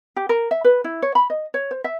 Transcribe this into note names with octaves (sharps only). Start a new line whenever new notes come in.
G4
A#4
E5
B4
E4
C#5
B5
D#5
C#5
C5
E5